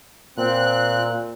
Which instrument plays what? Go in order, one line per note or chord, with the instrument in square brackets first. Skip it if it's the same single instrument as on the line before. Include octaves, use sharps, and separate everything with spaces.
[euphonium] A#2 [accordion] C4 F#6